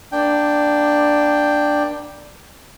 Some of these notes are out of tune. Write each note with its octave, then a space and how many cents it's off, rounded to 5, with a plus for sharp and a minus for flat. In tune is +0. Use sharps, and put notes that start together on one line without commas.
A#3 +25 D4 +5 G5 +0